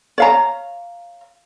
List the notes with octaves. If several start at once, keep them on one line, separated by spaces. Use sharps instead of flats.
C#5 F5 A#5